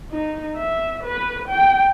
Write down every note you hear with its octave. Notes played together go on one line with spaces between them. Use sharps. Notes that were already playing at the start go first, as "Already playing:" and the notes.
D#4
E5
B4
G5